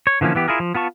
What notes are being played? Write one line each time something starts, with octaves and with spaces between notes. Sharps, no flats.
C#5
D3 E3 F3 A#3 C#4
E3 B3 G4
E4 F4 G#4 A#4
F3
B3 F4 A5 C#6